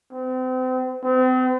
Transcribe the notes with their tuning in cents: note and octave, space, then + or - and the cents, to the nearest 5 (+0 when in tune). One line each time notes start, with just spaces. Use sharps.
C4 -35
C4 -40